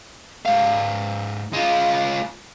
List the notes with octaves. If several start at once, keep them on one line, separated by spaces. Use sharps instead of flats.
G#2 F5
G#3 F4